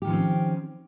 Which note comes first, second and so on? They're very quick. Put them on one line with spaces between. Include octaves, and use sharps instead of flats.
G4 D#3 F3 C#4 C4